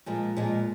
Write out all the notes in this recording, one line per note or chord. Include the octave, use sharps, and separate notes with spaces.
A#2 F3 G#3
A#2 F3 G#3